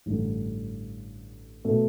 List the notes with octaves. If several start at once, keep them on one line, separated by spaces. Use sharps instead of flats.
A1 G2 D3
B2 A3